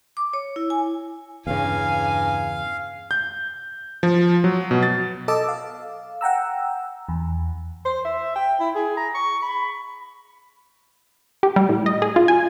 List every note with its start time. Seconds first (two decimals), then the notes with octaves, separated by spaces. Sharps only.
0.17 D6
0.33 C#5
0.56 E4
0.70 G#5
1.47 E2 G2 C#3 F5 G#5
3.11 G6
4.03 F3
4.44 F#3
4.71 B2
4.83 A6
5.28 A4 D#5 A5 D6 E6
5.48 F5
6.21 F#5 G5 A#5 E6
7.09 E2
7.85 C5
8.05 E5
8.36 G5
8.60 E4
8.75 G#4
8.97 A#5
9.15 C#6
9.43 B5
11.43 G4
11.56 G3
11.69 A2
11.86 D#5
12.02 G#4
12.16 F4
12.28 G#5